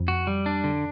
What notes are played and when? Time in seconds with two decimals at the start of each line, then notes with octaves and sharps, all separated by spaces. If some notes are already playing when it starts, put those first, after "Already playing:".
Already playing: F2
0.08 F#4
0.27 G3
0.46 D4
0.64 D3